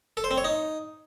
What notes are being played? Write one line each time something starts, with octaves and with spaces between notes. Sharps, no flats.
A4
C5
C4
C#5
D#4